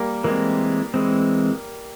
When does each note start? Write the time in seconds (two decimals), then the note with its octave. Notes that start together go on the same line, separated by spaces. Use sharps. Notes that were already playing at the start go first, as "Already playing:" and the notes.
Already playing: G3 A#3
0.24 E3 G#3 A#3 C4
0.94 E3 G#3 C4